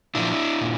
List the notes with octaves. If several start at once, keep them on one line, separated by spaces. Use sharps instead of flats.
A#2 F3 D4 E4
A#2